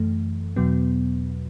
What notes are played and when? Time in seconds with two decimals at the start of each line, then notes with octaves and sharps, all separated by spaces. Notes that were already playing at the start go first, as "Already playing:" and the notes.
Already playing: F#2 E3 A3
0.56 E2 B2 F#3 B3